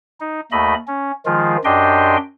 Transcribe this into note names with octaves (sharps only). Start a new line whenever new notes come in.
D#4
D#2 A3 D#5 B5
C#4
D#3 F3 G#3 F4
F#2 D4 G4 D#5 G5 C6